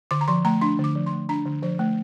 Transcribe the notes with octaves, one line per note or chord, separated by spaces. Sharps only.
D3 D6
A#5
F3 C6
A3 A#5
D4 C6
D3 D6
F3
C6
A3
D4 A#5
D3
F3 C5
A3